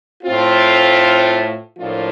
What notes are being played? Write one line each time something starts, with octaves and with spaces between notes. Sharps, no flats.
A2 A3 C4 F4
A2 F3 A#3 D4 F4